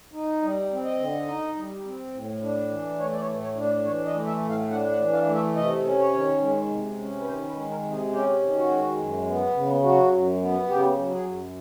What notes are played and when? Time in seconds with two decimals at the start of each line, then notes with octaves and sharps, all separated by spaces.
0.13 D#4
0.42 G3
0.71 C4
0.85 D#5
0.99 D3
1.28 D#4
1.56 G3
1.85 C4
2.14 A2
2.42 D4
2.70 E3
2.99 A3 C#5
3.13 D5
3.20 C#5
3.27 A2
3.42 C#5
3.55 D4
3.64 D5
3.85 E3 C#5
4.05 D#5
4.14 A3
4.27 E5
4.42 A2
4.49 F5
4.70 D4 F#5
4.91 F#5
4.99 E3
5.13 F5
5.27 A3
5.34 E5
5.56 C3 D#5
5.84 C#4
5.99 C#5
6.13 D#3
6.41 G#3
6.69 C3
6.98 C#4
7.20 B4
7.26 D#3 C5
7.48 B4
7.56 G#3
7.70 A#4
7.83 C3
7.91 G#4
8.12 C#4 G4
8.41 D#3
8.55 F#4
8.69 G#3
8.97 F#2
9.26 B3
9.54 C#3
9.83 F#3 F#4
10.12 F#2
10.41 B3
10.68 C#3 G4
10.98 F#3
11.12 G#4
11.25 F#2